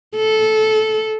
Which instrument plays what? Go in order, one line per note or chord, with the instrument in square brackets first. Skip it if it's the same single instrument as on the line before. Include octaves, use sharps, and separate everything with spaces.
[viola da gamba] A4